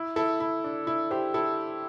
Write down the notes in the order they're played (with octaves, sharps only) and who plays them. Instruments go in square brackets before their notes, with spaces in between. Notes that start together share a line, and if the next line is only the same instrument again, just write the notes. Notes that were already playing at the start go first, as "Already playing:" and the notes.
Already playing: [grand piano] E4
E4 A4
E4
D4
E4
G4 C5
E4 A4